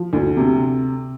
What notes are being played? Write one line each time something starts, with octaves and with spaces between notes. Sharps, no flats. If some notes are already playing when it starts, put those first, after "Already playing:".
Already playing: F3
D2
C3